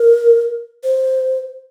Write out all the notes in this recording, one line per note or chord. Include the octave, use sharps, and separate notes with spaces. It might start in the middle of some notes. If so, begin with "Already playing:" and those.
Already playing: A#4
C5